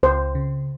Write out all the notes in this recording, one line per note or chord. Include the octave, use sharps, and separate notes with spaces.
C#2 C5
C#3